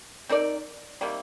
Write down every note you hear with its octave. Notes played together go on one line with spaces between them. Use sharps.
C4 D#4 A#4 D5
C3 D#3 G3 A#3